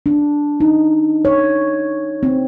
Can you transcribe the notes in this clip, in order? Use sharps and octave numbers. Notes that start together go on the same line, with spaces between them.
D4
D#4
C#5
C4